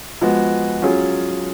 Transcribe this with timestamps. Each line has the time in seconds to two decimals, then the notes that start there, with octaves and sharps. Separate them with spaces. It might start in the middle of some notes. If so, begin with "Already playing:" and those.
0.21 F3 G#3 B3 F#4
0.82 F#3 C#4 F4 G#4